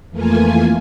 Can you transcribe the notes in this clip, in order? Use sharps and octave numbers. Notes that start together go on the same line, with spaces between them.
F2 E3 A3 A#3 F4 G#5